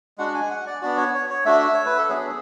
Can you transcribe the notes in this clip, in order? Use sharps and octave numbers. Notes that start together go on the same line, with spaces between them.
G#3 D4 F#4 F#5
G#5
F#5
D5
B3 D4 F#4 D5
C#5
C#5
C#5
A3 D4 F#4 E5
C#5
B4
A4
F#3 B3 D4 F#4 G#4